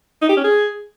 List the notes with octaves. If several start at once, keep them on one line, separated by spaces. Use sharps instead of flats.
D#4
G4
C#4
G#4